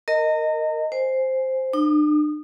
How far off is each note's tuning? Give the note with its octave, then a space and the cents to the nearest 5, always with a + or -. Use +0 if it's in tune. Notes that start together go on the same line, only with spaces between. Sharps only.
A#4 -15 D#5 +0 A#5 -40
C5 +0 G#5 +0
D4 +40 D#6 -25